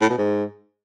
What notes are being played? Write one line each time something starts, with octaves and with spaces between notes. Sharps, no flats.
A2
B2
G#2